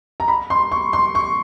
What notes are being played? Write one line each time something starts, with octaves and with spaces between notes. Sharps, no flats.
A#5
B5
C6
C#6
C6
C#6